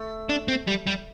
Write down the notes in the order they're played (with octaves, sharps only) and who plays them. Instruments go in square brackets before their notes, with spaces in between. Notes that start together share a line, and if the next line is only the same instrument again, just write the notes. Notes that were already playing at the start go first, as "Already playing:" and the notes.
Already playing: [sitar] A3
[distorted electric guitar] D4
C4
G3
G3